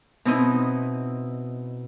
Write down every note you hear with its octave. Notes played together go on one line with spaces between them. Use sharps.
B2 C4 D#4 E4 D#6